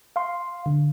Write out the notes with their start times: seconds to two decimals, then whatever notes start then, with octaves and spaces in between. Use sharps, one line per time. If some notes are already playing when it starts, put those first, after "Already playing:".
0.16 F5 C6
0.66 D3